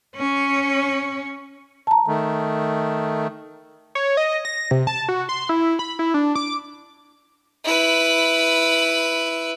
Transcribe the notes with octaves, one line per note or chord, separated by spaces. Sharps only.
C#4 C#5
A5 A#5
D#3 A3
C#5
D#5
A#6
C3
A5
F#4
C6
E4
B5
E4
D4
D6
E4 B4